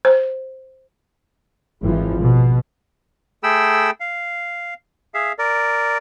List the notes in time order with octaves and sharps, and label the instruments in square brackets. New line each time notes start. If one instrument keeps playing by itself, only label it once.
[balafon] C5
[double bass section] G#1 E3 F3
B2
[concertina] A3 G#4 A4 G5 B5 E6
F5
G#4 E5 F5
A#4 D5